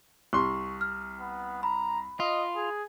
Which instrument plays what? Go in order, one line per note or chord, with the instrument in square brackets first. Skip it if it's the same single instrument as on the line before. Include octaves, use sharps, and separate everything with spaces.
[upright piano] C2 C6 [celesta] C#6
[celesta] F6
[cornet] B3
[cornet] A#5 [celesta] B5
[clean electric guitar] F4 [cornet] D#5
[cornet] G#4